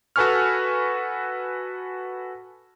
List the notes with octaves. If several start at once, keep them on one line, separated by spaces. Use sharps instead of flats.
F#4 A4 B4 G#5 C#6 F6